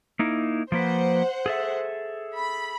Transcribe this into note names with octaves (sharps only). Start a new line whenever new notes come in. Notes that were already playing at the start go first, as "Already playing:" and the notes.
A#3 D#4 E4
F3 A#3 B4 C5 F#5
G#4 A4 E5
B5